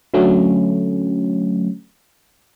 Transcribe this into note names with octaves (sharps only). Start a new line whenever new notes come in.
D3 F#3 A3 C#4